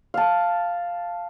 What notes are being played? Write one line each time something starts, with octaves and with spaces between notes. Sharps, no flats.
F5 A5